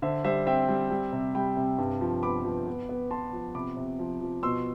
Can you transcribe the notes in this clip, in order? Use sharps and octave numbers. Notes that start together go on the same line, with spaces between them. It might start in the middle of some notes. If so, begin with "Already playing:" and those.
D3 C5 E5
G3 C5 E5
C4 E5 G5
G3
G3
C3
G3 G5 B5
C3
G2
F3
B3 B5 D6
F3
B3
B3
B3 A5 C6
F3
C3 B5 D6
C3
F3
F3
B2 C6 E6